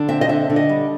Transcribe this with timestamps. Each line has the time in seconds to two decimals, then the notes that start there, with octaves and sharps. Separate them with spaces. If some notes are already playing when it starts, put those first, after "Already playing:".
Already playing: D3
0.09 C4 E5
0.21 D#5
0.29 D3 E5
0.50 D3
0.56 D#5
0.69 G3